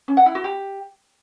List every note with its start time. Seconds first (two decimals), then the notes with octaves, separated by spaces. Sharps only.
0.08 C#4
0.17 F#5
0.26 E4
0.35 F#4
0.44 G4